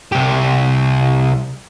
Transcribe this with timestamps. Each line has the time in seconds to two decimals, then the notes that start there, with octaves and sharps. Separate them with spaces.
0.12 C2 G4